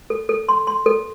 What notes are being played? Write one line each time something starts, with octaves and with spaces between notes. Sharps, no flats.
A4
A4
C6
C6
A4